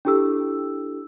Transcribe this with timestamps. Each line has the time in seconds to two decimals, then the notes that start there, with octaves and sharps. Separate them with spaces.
0.05 D4 E4 G4 A4 E6